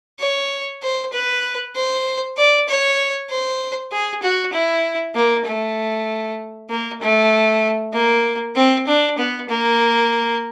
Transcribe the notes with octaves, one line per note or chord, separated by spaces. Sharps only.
C#5
C5
B4
C5
D5
C#5
C5
G#4
F#4
E4
A#3
A3
A#3
A3
A#3
C4
D4
B3
A#3